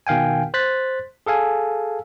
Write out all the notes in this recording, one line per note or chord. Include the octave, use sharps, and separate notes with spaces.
B2 D#3 F5 G5 G#5
C5 F#6 A6 B6
G#4 A4 F5 G#5